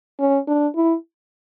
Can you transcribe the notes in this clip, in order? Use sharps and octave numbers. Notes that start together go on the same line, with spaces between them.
C#4
D4
E4